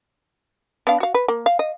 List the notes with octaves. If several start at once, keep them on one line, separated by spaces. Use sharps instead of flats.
B3 D4 F5
F#4 F5
B4
A#3
F5
D#5